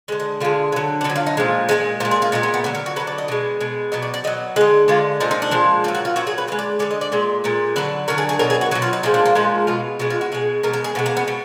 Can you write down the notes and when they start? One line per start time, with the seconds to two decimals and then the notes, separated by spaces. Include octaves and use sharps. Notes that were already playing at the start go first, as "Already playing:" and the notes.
0.08 D3 G#3 D#5
0.20 D#5
0.40 D3 G#3 F4
0.72 D3 F#3
1.01 D4
1.04 D3 D#4
1.10 F#3
1.16 F4
1.26 D#4
1.37 A#2 F3 G#3
1.69 A#2 F3 G#3 D#4
2.00 A#2 F4
2.05 G#3
2.11 G#4
2.22 F4
2.32 A#2 G#3 D#4
2.43 B3
2.54 B3
2.64 D3 F#3 B3
2.75 A#4
2.86 F#4
2.96 F#3 B4
3.00 D3
3.07 D5
3.18 D#5
3.28 B2 G#3
3.60 B2 G#3
3.92 B2 F#3 D#5
4.02 D5
4.14 D5
4.24 B2 F#3 D#5
4.56 G#3 D#5
4.61 D3
4.88 D3 G#3 F4
5.20 A#2 F3 G#3 D#4
5.31 D#4
5.42 D4
5.51 A#2 F3 G#3
5.84 A#2 F4
5.88 F#3
5.95 F#4
6.05 F4
6.16 A#2 F#3 F#4
6.27 G#4
6.38 B4
6.48 D3 D#5
6.52 G#3
6.59 D5
6.79 D3 G#3 D5
6.91 D#5
7.01 D5
7.12 A#2 G#3 D5
7.44 A#2 G#3
7.76 D3 F#3 B4
8.08 D3 F#3 A#4
8.18 G#4
8.29 G#4
8.39 B2 F#3 A#4
8.50 G#4
8.61 F#4
8.71 F#3 F#4
8.75 B2
8.82 F4
8.93 D#4
9.03 A#2 F3 G#3 D#4
9.14 D4
9.25 A#3
9.35 A#2 F3 G#3 D#4
9.67 B2 G#3 F4
9.99 B2 G#3 D#4
10.10 F4
10.21 F#4
10.32 B2 G#3 G#4
10.63 B2 G#3 A#4
10.73 A#4
10.84 G#4
10.95 B2 B3
10.99 G#3
11.06 A#3
11.17 B3
11.28 B2